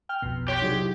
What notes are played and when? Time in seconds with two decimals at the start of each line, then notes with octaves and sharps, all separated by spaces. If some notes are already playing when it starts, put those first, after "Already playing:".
0.09 G5 F6
0.22 B1 F2 B2
0.48 G4 C#5 G5 C6 F#6
0.62 C3 F#3 D4 D#4 F#4 G#4
0.77 E4